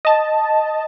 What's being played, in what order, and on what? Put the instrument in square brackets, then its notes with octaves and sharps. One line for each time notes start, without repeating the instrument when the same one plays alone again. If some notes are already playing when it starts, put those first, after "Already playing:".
[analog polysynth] D#5 A5